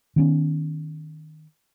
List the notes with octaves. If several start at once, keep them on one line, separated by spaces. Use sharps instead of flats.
D#3 B3 C#4